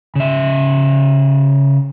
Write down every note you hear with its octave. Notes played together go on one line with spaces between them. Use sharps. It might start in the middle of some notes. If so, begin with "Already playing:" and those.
C#3 E5